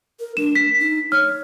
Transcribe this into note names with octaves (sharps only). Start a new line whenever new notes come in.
A#4
D4 E7
B6
D#4
C#5 F6